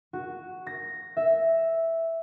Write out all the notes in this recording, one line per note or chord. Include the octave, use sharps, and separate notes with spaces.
F#4
A#6
E5